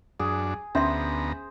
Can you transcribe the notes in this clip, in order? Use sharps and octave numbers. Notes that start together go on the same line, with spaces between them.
F#2 D4 G#4
D2 B3 C#4 C5 E5 A#5 C6